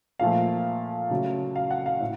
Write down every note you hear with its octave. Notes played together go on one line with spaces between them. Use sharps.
A#2 F3 A3 F5
C#3 F#3 A3
F5
F#5
F5
A2